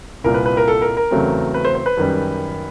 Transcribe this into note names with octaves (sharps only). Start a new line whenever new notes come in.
C2 A#2 G3 A#4
B4
B4
A#4
A4
A#4
A#4
E2 C#3 F#3 A3 C4
B4
C5
C5
B4
F#2 D#3 G3